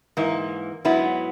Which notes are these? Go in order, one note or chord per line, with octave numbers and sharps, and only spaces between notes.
G#2 E3 A#3
G#2 F#3 B3 E4